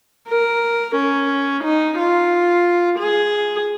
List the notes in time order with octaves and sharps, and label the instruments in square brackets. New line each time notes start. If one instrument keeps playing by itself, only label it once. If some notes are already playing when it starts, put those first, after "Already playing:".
[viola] A#4
C#4
D#4
F4
G#4